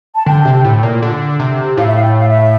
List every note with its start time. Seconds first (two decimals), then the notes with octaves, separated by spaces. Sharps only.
0.15 A5
0.26 D3 G5
0.45 C3
0.64 A2
0.83 A#2
1.02 D3
1.39 C3
1.77 A2 F5
1.86 E5
1.95 F5
2.03 G5
2.18 F5
2.28 E5